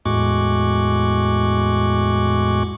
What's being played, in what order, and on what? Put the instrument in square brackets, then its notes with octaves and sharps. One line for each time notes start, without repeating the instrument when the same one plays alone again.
[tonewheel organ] E2 A2 G#3 F#4 C#6 D6